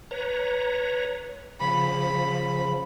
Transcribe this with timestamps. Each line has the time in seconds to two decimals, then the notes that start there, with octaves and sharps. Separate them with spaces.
0.11 B4 C#5 A#5
1.61 C#3 F3 B5